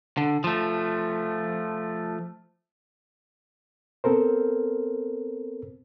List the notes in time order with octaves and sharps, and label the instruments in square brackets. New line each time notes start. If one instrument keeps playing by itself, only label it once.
[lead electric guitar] D3
F3 A3
[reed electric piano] B3 C4 A4 A#4 C5